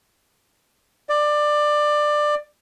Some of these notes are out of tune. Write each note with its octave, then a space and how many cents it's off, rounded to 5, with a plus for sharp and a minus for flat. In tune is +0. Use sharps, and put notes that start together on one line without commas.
D5 +20